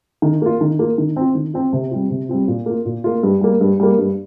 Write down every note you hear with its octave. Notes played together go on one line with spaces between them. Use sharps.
D#3
A#3 F4
D#3
A#3 F4
D#3
C4 F4
D#3
C4 F4
C3
G3 C4 F4
C3
G3 C4 F4
A#2
A#3 F4
A#2
A#3 F4
G2
G3 A#3
G2
G3 A#3
G2